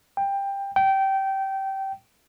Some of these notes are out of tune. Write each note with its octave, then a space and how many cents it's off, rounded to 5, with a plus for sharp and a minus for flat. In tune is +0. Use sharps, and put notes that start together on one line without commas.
G5 +15
G5 -20